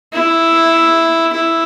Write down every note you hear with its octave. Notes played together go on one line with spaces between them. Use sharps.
E4
E4